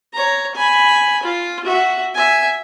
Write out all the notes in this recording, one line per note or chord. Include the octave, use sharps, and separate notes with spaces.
C#5 A#5
G#5 B5
F4
F#4 E5
E5 G#5